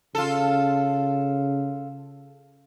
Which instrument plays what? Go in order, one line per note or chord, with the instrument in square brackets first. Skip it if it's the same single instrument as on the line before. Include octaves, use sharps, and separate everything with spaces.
[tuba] C#3 [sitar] F4 A4